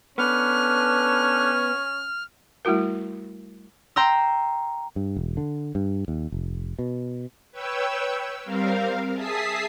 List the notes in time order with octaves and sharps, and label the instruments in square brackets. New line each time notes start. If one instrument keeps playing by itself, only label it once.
[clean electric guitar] B3 [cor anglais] C#4 [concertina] D4 A4 B4 [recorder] F6
[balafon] G3 A3 E4 F#4 A#4
[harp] G5 A#5 C6 E6
[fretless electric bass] G2
E1
D3
G2
D#2
F1
B2
[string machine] B4 C#5 G5 E6
G3 C4 A#4 F5
G#4 E5 A5 D#6 B6 C7